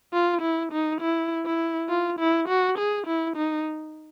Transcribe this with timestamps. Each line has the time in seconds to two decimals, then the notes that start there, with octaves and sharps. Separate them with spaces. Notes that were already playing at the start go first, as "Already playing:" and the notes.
0.13 F4
0.42 E4
0.72 D#4
1.01 E4
1.46 E4
1.89 F4
2.19 E4
2.49 F#4
2.78 G#4
3.07 E4
3.37 D#4